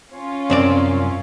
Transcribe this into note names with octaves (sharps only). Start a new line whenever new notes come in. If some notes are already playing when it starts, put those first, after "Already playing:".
C#4 F4
C2 F#2 C4 D5